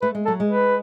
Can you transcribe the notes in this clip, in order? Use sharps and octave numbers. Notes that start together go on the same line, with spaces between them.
A3 B4
G#3
F#3 A4
G#3
B4